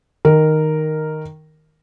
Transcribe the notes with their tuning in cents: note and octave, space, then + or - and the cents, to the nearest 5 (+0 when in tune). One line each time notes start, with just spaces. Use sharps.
D#3 +0 A#4 -5